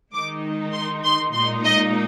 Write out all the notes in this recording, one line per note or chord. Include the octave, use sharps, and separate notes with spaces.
D#3 G#3 D#4 D6
C6
C6
A#2 G#3 D#4 C6
D#5